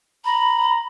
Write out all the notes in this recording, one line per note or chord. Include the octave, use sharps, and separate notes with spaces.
A#5 B5